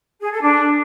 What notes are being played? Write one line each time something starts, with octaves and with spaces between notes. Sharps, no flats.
G#4
A4
D4